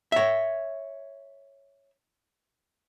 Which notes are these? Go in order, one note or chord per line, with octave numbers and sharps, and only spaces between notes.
C#5 E5